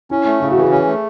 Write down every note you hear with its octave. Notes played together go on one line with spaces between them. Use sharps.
C#4 E4
A3
C#3 E4
F#4
E3
G#4
C#4
A3